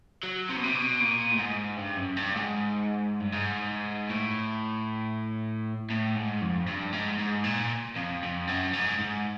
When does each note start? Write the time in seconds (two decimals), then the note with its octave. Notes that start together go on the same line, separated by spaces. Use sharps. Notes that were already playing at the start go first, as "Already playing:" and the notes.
0.23 F#3
0.49 C3
0.56 B2
0.63 C3
0.75 B2
1.00 A#2
1.31 A2
1.39 G#2
1.77 G2
1.97 F#2
2.17 G2
2.36 G#2
3.20 G2
3.32 G#2
4.09 A2
5.90 A2
6.15 G#2
6.41 F2
6.67 G2
6.92 G#2
7.18 G#2
7.44 A#2
7.96 F2
8.22 F2
8.47 F#2
8.73 G#2
8.99 G#2